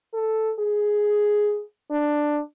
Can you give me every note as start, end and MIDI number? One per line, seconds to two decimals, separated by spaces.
0.14 0.53 69
0.59 1.62 68
1.91 2.40 62